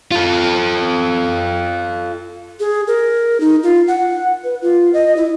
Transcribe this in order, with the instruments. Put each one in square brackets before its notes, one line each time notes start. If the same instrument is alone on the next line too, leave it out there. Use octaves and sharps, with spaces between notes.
[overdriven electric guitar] F4 A4
[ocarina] G#4
A#4
D#4
F4
F#5
B4
F4
D#5
E4